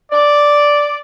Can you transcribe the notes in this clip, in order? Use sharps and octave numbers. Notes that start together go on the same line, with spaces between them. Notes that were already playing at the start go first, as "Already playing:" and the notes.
D5